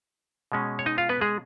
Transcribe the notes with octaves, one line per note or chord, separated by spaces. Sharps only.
B2 G#3 C#4
C#5
D#4 D#5
F4 F5
B3 B4
G#3 G#4